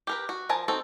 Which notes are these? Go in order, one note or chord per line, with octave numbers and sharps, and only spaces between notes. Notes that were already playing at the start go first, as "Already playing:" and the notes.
G4 A#4 B4
F#4
F3 A#4 G#5 A5
C4 D#4 F#4 A4